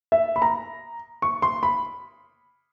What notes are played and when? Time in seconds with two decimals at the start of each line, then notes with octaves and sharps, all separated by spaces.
0.12 E5
0.36 B5
0.42 A#5
1.22 C#6
1.42 C6
1.63 B5